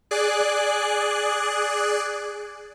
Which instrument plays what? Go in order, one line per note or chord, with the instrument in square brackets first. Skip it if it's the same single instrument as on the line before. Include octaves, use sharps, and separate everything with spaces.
[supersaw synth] G#4 D5 F#6